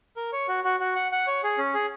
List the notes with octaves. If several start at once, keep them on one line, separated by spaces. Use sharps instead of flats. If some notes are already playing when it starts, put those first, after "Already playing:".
A#4
C#5
F#4
F#4
F#4
F#5
F#5
C#5
G#4
C#4
G#4